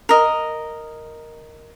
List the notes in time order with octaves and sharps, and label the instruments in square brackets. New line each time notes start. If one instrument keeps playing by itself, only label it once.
[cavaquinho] A#4 D#5